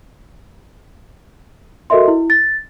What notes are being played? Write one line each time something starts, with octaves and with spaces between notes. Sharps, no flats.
F#4 A4 A#4 D#5 E5 C6
E4
A6